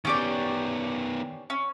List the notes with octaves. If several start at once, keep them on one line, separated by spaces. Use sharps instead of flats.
D#3 B3 C#4 G4 D5
C#4